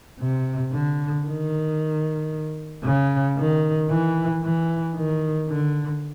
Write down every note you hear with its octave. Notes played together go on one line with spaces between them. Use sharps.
C3
D3
D#3
C#3
D#3
E3
E3
D#3
D3